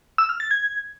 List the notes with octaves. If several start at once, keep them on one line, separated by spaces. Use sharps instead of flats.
E6
F6
A6
G#6